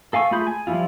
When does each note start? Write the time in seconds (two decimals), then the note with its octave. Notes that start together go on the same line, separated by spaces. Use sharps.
0.13 A4 F5 G#5 C#6 E6
0.31 A3 F4 G#4 B5 G6
0.47 G#5
0.67 F3 G3 A3 E4 F4